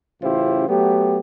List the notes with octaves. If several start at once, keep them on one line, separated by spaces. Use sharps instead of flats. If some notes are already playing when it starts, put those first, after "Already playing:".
A1 C#3 E4 F4 G4 C5
F#3 A3 B3 G4